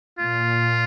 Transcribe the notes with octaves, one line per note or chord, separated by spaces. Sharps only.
A#2 F4